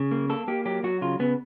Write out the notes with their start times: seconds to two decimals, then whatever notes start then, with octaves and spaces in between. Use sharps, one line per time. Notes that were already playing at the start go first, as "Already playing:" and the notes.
Already playing: C#3
0.11 A#3
0.30 A#3 A4
0.48 A#3 G4
0.65 F#3 G4
0.83 F#3 F#4
1.01 C#3 F4
1.19 C#3 B3